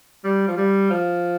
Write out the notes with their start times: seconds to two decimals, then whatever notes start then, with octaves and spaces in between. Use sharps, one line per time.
0.24 G3
0.48 F3
0.57 G3
0.90 F3